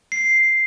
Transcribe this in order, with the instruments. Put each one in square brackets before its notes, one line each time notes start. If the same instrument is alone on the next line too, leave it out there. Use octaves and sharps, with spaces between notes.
[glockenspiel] C7